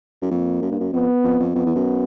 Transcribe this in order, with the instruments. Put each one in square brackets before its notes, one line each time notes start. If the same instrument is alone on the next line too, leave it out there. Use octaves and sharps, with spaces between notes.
[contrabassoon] F#2
[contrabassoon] F2 [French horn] A#3
[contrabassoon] F#2
G2
F#2
[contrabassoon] F2 [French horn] B3
[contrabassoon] F2
F2
[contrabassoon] F2 [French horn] B3
[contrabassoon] E2
F#2